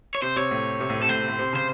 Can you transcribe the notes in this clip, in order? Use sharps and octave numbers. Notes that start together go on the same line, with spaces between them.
C#5
C3 C5
C3 C#5
A2
C3
A2
C3 A4
A2 C5
C3
A2
C3
C#3 C5